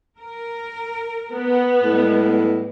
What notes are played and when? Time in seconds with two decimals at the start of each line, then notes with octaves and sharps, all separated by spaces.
0.17 A#4
1.34 B3
1.83 A2 G3 G#3